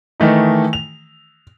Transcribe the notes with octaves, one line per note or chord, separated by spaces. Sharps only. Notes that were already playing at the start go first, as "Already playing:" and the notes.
D#3 E3 A3 D#4
F7